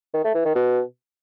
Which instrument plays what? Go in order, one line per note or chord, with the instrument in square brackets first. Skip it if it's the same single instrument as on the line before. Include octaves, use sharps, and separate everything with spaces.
[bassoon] D#3
A3
E3
D#3
B2